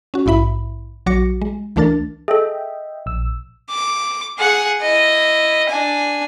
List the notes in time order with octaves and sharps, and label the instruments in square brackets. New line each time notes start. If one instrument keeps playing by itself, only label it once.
[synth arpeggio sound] C#4 F#4
A#1 G#2 E4 E5 B5
A#1 F#3 F#4 D6 A#6 C#7
G#3
C#2 E3 A3 D4 A#4 A6
[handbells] G#4 A4 [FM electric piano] D#5 E5 G5
[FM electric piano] A#1 E6
[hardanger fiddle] D6
G#4 F#5
E4 D#5
D4 G#5